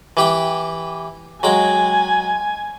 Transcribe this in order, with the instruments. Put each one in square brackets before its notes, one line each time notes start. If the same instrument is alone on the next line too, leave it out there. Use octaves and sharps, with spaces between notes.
[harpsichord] E3 G4 G5
[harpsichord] F#3 G#3 G5 [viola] G#5